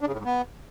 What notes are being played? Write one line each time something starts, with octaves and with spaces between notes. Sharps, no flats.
D4
C#3
A2
G#2
B3